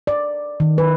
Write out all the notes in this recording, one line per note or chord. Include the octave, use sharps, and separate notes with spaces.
D5
D#3
B4